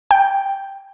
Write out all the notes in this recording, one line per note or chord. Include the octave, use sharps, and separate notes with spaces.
G5